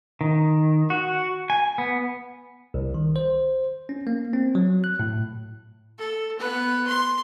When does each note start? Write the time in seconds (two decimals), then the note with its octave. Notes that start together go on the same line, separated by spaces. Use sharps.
0.21 D#3
0.90 F#4
1.50 G#5
1.78 B3
2.74 C2
2.94 D#3
3.16 C5
3.89 C#4
4.07 A#3
4.33 C4
4.55 F#3
4.84 F#6
4.99 A2
5.99 A4
6.39 B3 B4
6.88 C6